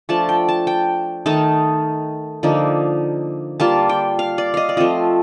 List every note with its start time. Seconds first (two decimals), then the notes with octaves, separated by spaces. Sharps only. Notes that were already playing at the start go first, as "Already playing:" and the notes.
0.09 F3 A3 D4 A5
0.29 G5
0.49 A5
0.67 G5
1.26 D#3 A3 D#4 A5
2.43 D3 F3 A#3 D#4
3.60 G3 A#3 F4 A5
3.89 G5
4.19 F5
4.38 D5
4.54 D#5 F5
4.69 D5
4.77 F3 A3 C4 F4 D#5